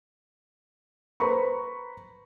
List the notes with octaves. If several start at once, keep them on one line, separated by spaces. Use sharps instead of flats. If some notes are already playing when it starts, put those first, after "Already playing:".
B4 C5 A#5 B5 C#6